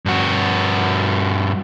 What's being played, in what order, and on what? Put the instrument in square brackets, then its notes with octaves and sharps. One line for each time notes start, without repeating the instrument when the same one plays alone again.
[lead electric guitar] G2 F#4